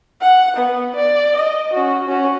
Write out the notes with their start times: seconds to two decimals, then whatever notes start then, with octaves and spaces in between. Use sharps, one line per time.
0.22 F#5
0.57 B3
0.95 D5
1.36 D#5
1.73 C#4 F#4
2.08 C#4 F#4